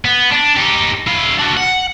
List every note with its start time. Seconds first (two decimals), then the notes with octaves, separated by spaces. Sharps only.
0.05 B3
0.32 D4
0.56 D#4 G4
1.07 E4 F5
1.39 D4 F#4
1.57 F#5